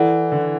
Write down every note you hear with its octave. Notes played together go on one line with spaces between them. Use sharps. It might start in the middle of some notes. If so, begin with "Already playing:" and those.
Already playing: E3 E4 A4 D5 F#5
D3